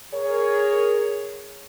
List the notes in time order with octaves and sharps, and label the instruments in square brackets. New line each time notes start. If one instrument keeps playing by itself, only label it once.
[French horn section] G#4 A#4 C#5